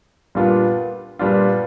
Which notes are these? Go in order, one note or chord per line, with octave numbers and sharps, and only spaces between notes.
A#2 G3 B3 D4 F4
A#2 G3 B3 D4 F4